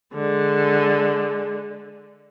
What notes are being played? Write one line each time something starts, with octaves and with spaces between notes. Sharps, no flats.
D3 G#3